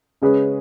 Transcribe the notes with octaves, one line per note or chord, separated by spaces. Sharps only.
C#3 G#3 C#4 G#4 B4